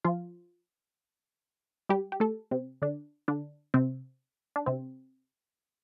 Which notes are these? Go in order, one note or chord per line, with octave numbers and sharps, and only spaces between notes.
F3 F4
G3 G4
G4
A3 A4
C3 C4
D3 D4
D3 D4
C3 C4
D4
C3 C4